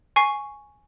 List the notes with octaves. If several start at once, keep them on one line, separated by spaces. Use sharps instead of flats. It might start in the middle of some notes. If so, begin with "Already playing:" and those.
G#5 C#6 C7